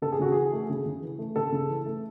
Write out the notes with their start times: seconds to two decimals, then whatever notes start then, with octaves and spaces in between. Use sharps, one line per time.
0.02 C#3 A4
0.12 G#4
0.19 C#3 F#4
0.32 E3 G#4
0.53 A3
0.70 C#3
0.86 C#3
1.02 E3
1.19 A3
1.36 C#3 A4
1.52 C#3
1.69 E3
1.86 A3